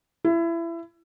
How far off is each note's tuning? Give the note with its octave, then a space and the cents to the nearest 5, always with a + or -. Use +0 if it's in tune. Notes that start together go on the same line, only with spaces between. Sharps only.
E4 +25